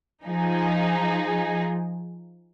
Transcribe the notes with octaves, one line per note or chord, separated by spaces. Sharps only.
F3 D#4 G#4